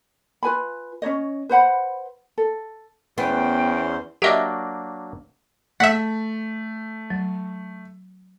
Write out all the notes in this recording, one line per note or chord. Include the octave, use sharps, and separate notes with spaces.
F4 B4 G#5 B5
C#4 D#4 C#5 D#5
B4 C5 F#5 B5
A4
E2 B3 C#4 C5 G5 C6
F#3 A#3 D4 G4 D#5 E5
A3 E5 F#5 B6
F#3